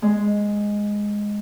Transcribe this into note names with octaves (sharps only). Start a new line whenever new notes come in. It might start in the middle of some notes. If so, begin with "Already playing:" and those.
G#3